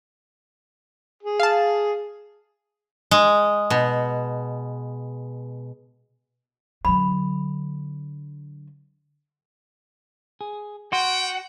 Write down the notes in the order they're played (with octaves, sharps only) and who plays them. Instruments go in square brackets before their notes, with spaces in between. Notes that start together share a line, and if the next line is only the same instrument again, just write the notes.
[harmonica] G#4
[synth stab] F5 A5
[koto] G#3
B2
[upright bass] D3 F#3 [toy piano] B5
[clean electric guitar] G#4
[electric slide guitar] F#4 [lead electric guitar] F#5 [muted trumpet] G5 [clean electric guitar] C6